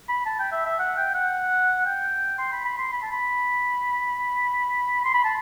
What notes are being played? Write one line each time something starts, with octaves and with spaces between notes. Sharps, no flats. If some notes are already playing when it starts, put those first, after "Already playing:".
B5
A5
G5
E5
E5
F#5
G5
F#5
G5
C6
B5
B5
C6
B5
A5
B5
C6
B5
A5